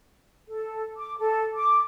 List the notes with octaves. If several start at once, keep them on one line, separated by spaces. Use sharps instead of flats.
A4
D6
A4
D6